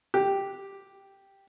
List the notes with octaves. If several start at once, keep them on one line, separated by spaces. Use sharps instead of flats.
G4